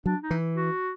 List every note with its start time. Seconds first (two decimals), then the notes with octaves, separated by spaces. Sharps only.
0.06 F#3 D4
0.23 D#4
0.31 E3
0.55 F#4